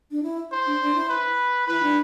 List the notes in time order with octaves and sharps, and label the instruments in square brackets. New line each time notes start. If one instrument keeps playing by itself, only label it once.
[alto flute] D4
E4
[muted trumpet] C5
[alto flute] D4
D4
E4
[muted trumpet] B4
[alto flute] E4 [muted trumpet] B4
[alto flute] D4